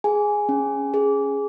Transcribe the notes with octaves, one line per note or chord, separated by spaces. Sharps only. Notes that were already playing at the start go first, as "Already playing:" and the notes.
G#4 G#5
C#4
G#4